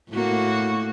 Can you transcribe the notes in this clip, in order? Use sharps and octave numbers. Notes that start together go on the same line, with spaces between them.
A2 A#3 F#4